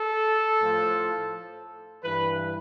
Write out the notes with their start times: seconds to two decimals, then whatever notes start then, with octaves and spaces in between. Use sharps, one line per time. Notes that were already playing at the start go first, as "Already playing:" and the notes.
Already playing: A4
0.60 A2 F3
2.04 G2 E3 B4